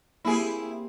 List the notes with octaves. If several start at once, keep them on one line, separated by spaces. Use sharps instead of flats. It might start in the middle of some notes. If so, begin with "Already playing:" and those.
A#3 C4 E4 G4 G#4